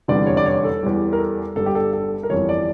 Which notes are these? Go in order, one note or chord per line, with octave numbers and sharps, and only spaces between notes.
F1 E2 D3 G3 D5
C#5
D5
C#5
A4
E2 E3 G3
A#4
A4
G1 G2 D3 G3 A4
G4
A4
A4
A#4
G1 F2 E3 G3 C#5
D5